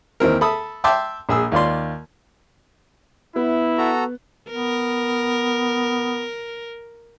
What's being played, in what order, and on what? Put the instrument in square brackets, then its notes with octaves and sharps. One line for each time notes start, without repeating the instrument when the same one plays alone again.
[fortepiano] D#2 E3 C4 A#4
A4 E5 B5 D#6
E5 G5 A5 C6 D6 E6
A#1 G#4 E6
D#2 F4 D5 C6
[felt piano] B3 [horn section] E4
[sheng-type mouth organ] F#4 A4 A#5
[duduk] B3 [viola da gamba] A#4